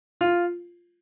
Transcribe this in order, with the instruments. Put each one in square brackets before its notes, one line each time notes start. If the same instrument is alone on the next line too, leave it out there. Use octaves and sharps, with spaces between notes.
[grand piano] F4